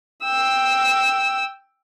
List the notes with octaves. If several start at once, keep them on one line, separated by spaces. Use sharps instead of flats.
G5 E6